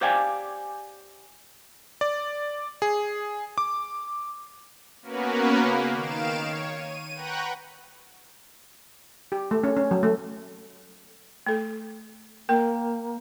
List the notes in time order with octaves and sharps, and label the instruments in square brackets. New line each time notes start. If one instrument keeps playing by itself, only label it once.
[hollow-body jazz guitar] G4 C5 D5 F5 G5 G#5
[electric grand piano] D5
G#4
D6
[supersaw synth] A#3 B3 C#4 F#4 A#4 B4
C#3 A#3
D#3 F5 D7 E7
C#5
D#7
B4 F#5 G5 A#5 C#6 F#6
[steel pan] G4
A3
C#4
C#4
F#3
A3
[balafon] A3 A4
[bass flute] A#3 [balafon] A#4 G5